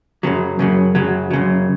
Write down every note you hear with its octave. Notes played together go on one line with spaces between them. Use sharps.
F#2 C#3 F#3
F#2 C#3 F#3
F#2 C#3 F#3
F#2 C#3 F#3